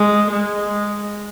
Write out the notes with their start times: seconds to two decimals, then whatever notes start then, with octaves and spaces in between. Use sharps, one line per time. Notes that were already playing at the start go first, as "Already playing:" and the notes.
Already playing: G#3
0.31 G#3